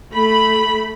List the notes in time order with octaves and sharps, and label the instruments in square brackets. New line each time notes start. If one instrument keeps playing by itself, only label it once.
[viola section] A3 B5